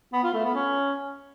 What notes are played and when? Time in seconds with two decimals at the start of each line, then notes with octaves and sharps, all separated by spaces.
0.13 B3
0.23 F4
0.34 A3
0.44 B3
0.55 C#4